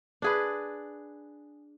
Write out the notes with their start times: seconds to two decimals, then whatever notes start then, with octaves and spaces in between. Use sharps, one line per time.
0.22 D4 G#4 B4